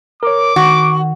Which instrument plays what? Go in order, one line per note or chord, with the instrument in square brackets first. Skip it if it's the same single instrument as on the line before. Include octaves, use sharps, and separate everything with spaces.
[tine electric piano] A#4 C#5 [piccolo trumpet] D6
[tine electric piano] D#3 [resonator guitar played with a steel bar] F#4